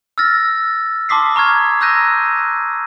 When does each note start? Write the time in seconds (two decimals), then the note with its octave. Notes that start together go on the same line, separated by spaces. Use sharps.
0.18 E6 F6 A6 A#6
1.09 A5 C6 D6 D#6 B6 C7
1.36 A#5 C#6 F6 G#6
1.81 A#5 E6 F#6 G6 A#6 D#7